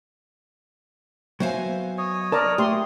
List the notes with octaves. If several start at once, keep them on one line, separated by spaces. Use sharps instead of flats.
F#3 B3 C5 E5 F5 G#5
C#5 D#5
A#4 D5 A5 A#5
A3 G4 C6 D#6